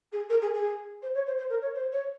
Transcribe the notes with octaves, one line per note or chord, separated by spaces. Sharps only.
G#4
A#4
G#4
G#4
C5
C#5
C5
C5
A#4
C#5
C5
C#5